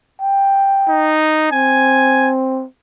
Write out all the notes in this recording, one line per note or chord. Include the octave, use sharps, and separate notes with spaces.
G5
D#4
C4 G#5